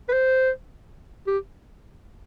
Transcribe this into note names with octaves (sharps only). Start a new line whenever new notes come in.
B4
C5
G4